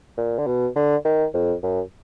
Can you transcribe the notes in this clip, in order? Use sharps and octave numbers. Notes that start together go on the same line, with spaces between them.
A#2
D3
B2
D3
D#3
F2
F#2